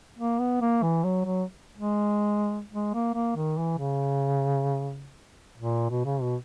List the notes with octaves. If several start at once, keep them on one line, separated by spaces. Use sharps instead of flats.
A#3
B3
A#3
E3
F#3
F#3
G#3
G#3
A#3
A#3
D#3
E3
C#3
A#2
B2
C#3
B2